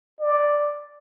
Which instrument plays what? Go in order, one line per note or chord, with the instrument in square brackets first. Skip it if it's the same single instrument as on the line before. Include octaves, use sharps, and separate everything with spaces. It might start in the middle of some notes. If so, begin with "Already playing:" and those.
[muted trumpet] D5